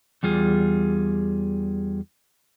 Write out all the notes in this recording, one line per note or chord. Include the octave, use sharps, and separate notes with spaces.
E2 G3 F4 G#4